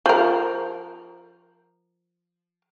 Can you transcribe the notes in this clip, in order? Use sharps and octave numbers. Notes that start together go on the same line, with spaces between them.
F3 A#4